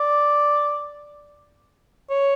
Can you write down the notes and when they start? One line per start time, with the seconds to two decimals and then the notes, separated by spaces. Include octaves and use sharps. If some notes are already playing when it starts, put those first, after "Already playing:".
Already playing: D5
2.10 C#5